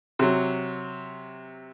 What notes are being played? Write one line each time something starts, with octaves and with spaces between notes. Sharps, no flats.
C3 F#3